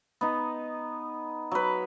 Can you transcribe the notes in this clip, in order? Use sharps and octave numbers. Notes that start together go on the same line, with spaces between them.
B3 D#4
F#3 B4